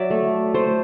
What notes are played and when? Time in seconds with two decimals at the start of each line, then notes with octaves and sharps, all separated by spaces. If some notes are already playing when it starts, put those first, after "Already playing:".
Already playing: F#3 D5 E5
0.10 A3
0.54 A3 C5